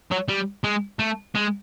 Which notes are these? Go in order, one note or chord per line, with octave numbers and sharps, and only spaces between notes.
F#3
G3
G#3
A3
G#3